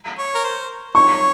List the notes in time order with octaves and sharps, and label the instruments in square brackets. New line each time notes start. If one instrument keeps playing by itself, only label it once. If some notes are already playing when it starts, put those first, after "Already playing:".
[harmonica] C#5
A#4
C5
[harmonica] C#5 [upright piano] C#6